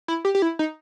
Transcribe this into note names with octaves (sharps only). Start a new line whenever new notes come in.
E4
G4
G4
E4
D#4